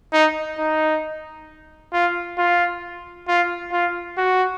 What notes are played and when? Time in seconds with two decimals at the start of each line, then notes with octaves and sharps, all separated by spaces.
0.13 D#4
0.58 D#4
1.93 F4
2.38 F4
3.28 F4
3.72 F4
4.18 F#4